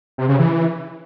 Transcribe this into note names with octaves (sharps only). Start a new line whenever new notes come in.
C3
C#3
E3